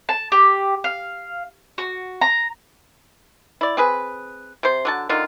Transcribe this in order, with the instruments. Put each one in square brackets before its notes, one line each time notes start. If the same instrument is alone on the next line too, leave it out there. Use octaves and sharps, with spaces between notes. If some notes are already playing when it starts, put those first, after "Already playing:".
[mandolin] A5
G4
F5
F#4
A#5
[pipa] E4 D5
C4 G#4 B4
C3 C5
D3 F#3 A5
D3 D#3 F4